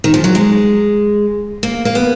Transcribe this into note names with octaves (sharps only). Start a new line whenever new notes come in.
D#3
F3
F#3
G#3
A#3
A#3
B3